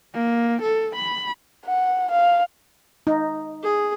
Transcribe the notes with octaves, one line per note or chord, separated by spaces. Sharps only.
A#3
A4
B5
F#5
F5
D#4
G#4